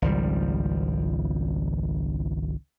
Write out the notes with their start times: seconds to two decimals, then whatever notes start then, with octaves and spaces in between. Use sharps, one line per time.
0.02 G#1 C#2 F3 G3